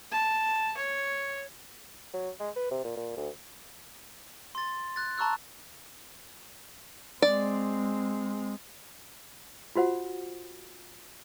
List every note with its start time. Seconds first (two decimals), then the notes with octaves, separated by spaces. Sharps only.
0.12 A5
0.77 C#5
2.13 F#3
2.40 G#3
2.56 B4
2.71 C3
2.84 A#2
2.97 A#2
3.16 D2
4.55 C6 A6
4.96 F#6 A6
5.18 A5 A#5 C#6 E6 F#6
7.22 G#3 C4 D5
9.75 F4 F#4 C5 F#5